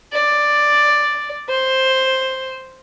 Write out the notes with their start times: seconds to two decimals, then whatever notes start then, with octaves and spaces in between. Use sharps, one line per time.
0.13 D5
1.49 C5